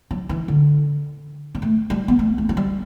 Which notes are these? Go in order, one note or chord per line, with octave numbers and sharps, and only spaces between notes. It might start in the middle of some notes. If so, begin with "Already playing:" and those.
F#3
E3
D3
G3
A3
G3
B3
A3
A3
F#3
G3